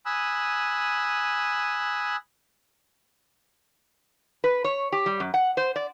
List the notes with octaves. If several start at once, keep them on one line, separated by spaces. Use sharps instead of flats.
G#5 B5 D#6 E6 F#6
B4
C#5
G4
G3
F#2
F#5
C5
D5